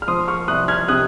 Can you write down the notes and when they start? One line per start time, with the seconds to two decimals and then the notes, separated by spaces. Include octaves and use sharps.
0.02 F6
0.08 F3 C6 D#6
0.28 C#6 F6
0.48 C2 D#6 F#6
0.68 F6 G#6
0.88 C3 D#6 F#6